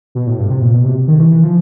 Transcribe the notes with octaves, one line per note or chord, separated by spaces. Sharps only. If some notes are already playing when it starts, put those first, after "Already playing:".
B2
A2
G2
C3
A#2
B2
C3
D#3
E3
E3
F3